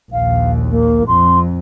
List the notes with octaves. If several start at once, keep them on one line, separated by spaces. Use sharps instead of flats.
A#1 D#2 F5
A#3
F2 C6